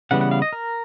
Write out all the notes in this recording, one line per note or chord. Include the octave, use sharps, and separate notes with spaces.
C#3 E3 G3 B3 F#5
F#5
F5
D#5
A#4